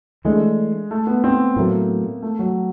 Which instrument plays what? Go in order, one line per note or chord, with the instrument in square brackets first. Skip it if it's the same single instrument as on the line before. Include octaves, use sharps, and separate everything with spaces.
[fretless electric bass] E3 A3 D4 [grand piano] G#3
[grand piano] A3
B3
C4
[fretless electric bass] A2 F#3 A3 [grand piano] A#3
[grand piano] A3
F#3